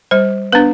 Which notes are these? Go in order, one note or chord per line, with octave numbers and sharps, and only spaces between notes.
G3 C5
B3 D4 B4